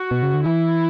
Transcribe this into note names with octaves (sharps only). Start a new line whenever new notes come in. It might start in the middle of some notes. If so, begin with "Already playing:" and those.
Already playing: F#4
B2
C#3
D3
E3 E4